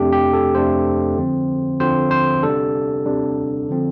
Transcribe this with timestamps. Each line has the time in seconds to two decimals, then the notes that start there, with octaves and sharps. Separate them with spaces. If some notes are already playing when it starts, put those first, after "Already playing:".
Already playing: F2 C3 A3 D4 G4
0.12 G4
0.33 A4
0.55 F2 C3 A3 D4 C5
1.17 D3 F3 C4
1.80 D3 F3 C4 C5
2.11 C5
2.43 C3 G3 D4 A4
3.06 C3 G3 D4
3.69 D3 F3 C4